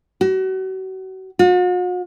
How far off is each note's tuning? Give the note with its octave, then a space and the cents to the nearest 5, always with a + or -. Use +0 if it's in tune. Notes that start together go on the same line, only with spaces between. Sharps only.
F#4 +35
F#4 -45